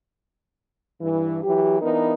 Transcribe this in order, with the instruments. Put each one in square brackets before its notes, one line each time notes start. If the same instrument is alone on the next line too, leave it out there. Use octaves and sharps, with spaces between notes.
[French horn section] G2 E3
E3 F#3 G4
E3 B3 D4 D#4 A#4